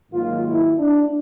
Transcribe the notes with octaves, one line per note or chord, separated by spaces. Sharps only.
G#2 D#3 F#3 A#3 F4
E4
D4